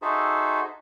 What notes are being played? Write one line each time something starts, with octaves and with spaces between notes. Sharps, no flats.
D#4 F#4 G#4 A4 C5 E5